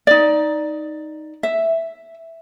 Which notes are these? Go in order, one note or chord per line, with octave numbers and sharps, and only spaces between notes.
D#4 D5
E5